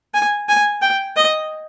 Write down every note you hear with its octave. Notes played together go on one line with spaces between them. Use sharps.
G#5
G#5
G5
D#5